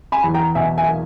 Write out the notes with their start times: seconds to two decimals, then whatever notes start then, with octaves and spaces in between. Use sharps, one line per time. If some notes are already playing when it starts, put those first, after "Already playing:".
0.12 G#5 B5
0.24 E2
0.34 G5 A#5
0.55 B2 E5 G#5
0.78 E5 G#5
0.89 A#3